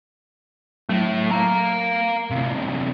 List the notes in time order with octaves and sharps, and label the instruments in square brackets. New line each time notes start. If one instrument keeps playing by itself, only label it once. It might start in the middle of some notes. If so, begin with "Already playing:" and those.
[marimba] F#3 [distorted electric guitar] A3 E4
[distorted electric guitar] F5 A#5
D2 C3